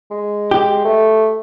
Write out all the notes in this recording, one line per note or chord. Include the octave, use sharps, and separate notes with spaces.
G#3
G4
A3